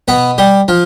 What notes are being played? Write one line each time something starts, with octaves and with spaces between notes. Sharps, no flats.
B2 B3 B4
G3 G4
F3 F4